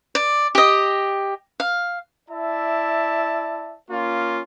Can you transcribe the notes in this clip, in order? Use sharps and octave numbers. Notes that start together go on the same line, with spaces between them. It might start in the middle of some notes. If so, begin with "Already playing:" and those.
D5
G4 D#5
F5
E4 D5 E5 A5
A#3 C#4 F4